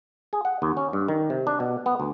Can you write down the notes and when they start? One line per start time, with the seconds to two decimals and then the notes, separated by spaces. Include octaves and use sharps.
0.33 G#4
0.45 F#5
0.62 D#2
0.77 C#4
0.93 G2
1.08 D#3
1.30 C3
1.47 D4
1.60 B2
1.86 B3
2.00 D2